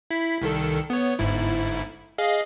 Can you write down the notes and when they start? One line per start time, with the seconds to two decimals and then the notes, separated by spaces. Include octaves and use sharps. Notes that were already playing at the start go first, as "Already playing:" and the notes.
0.11 E4 B6
0.41 C2 D#3 A4
0.90 B3 C#5
1.19 G1 G#2 E4
2.18 G#4 D#5 F5